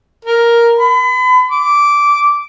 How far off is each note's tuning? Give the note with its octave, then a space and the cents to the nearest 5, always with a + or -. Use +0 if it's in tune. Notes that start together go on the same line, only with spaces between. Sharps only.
A#4 +5
B5 +35
D6 -10